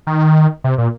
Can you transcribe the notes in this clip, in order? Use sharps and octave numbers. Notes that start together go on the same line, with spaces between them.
D#3
C3
A#2